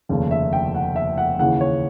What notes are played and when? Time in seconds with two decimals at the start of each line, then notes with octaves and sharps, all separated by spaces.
0.09 F1 D#2 C#3
0.31 E5
0.53 G5
0.75 F#5
0.96 E5
1.18 F#5
1.39 D#2 C#3 E3 F#5
1.61 C#5